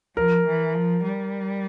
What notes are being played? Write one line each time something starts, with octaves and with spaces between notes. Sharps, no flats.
F3 A#4
E3
F3
G3